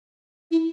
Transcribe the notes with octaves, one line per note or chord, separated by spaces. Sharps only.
E4